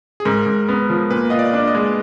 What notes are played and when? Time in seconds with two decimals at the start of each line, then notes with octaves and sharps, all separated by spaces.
0.20 G#4
0.25 G#2 A#4
0.46 G#2
0.69 B3
0.90 F3
1.10 A#2 B4
1.30 F4 D#5
1.39 D5
1.53 D4
1.67 D#5
1.75 G#3